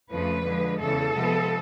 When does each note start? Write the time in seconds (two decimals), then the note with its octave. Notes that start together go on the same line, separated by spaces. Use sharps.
0.12 F2 C#3 F3 A3 B4
0.45 D3 F3 G#3
0.80 E2 C#3 E3 A4
1.14 C3 F3 G#3 B3